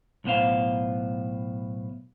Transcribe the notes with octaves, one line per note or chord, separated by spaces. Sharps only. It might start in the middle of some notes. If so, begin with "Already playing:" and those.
B1 A2 B3 C5 F5